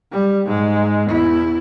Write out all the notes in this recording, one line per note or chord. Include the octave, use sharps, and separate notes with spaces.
G3
G#2 G#3
E2 E4